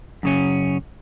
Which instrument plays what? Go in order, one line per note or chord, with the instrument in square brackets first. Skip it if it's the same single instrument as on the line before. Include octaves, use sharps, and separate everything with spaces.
[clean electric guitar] F#2 C#3 C#4